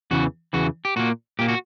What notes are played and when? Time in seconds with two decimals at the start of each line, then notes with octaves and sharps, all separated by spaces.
0.11 E2 C#3 E3 F#4
0.53 E2 C#3 E3 F#4
0.85 G4
0.96 A#2 A#3 F#4
1.39 A#2 A#3 G4
1.48 F#4